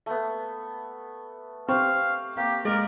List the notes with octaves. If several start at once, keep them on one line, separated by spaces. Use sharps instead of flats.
A3 B3
C4 G4 F5 C#6
A#3 G4
G#3 A#4 D5